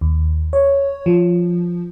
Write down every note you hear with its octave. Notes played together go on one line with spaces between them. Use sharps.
D#2
C#5
F3